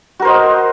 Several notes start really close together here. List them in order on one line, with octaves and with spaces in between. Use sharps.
F#4 A#4 C5 D#5